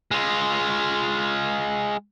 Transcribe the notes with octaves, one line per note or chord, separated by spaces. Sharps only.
G#3 F4